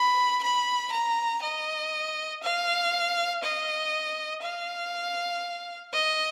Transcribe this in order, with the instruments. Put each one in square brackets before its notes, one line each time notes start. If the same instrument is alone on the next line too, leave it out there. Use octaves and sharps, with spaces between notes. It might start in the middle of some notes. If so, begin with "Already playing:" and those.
Already playing: [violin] B5
B5
A#5
D#5
F5
D#5
F5
D#5